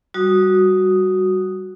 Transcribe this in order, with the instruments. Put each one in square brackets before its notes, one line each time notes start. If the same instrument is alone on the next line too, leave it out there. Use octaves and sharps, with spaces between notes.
[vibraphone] G3 F#4 D#6